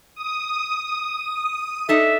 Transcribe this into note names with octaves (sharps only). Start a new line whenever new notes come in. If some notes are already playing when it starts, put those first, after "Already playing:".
D#6
D4 D#4 A4 E5